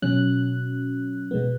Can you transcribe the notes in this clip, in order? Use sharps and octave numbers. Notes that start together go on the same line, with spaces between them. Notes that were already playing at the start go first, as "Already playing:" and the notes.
B2 F#3 C#4 F#6
B2 G#3 B3